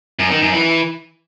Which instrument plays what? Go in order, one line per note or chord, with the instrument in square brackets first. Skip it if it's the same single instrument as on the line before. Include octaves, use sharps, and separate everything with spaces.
[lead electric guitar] F#2
D#3
F#2
E3